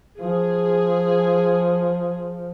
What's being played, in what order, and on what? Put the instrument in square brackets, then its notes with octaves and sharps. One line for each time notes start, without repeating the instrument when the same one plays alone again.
[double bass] F3 [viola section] G#4